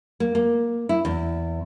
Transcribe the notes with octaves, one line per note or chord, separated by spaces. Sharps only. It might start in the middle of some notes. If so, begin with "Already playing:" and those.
A#3
A#3
E4
E2